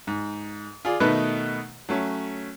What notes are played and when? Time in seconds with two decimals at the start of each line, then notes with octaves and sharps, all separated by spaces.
0.07 G#2
0.85 F4 G#4 D5
1.00 B2 D#3 A3 D#4 B4 F#6
1.89 F#3 A3 C#4